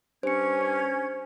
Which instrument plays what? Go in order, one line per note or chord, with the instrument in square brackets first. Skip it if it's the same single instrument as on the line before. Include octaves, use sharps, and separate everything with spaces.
[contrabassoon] G2 [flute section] C#4 G#6 [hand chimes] C5 C#7